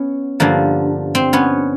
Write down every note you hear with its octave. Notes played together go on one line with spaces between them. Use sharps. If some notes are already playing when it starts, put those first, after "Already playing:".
Already playing: B3 C#4
G2 D3 F3 A#3
C4
B3 C#4